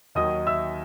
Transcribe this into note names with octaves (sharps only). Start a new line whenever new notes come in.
D#2 D#3 F#3 D#5 D#6
E5 E6